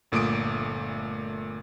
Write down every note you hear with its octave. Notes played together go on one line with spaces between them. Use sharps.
G1 A#2 A3 D6 D#6 D7